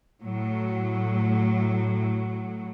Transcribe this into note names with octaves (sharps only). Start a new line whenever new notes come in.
A2 F#3